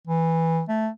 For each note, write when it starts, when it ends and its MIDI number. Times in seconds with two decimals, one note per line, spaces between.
0.07 0.62 52
0.68 0.89 57